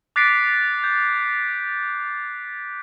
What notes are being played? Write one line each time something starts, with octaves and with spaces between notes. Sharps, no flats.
D6 F#6 A6 B6 C7 D7
G6